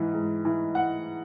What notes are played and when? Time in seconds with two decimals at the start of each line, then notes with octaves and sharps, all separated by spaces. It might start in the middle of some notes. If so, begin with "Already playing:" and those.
Already playing: G#2 E3
0.14 G#2
0.45 E3
0.75 F#5